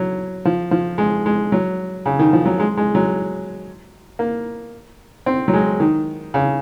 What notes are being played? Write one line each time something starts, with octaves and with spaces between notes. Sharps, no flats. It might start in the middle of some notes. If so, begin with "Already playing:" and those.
Already playing: F#3
F3
F3
G#3
G#3
F#3
C#3
D#3
F3
F#3
G#3
G#3
F#3
A#3
C4
F#3
G#3
D#3
C#3